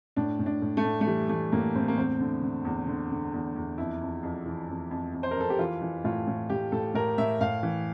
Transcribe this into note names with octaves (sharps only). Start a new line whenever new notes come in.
A2 D4
A2
D4
A2
A3
A2
A3
E3 G3
E3 A3
A2 A#3
A2 C4
A#3
E2 C4
D3
D3
E2
D3
D3
E2
E2
F2 E4
F2
F2
E3
F2
F2
F2
C5
A#4
F2 A4
G4
E3 F4
E3
A2 F4
A2
A2 G4
A2 A4
A2 A#4
A2 E5
A2 F5
E3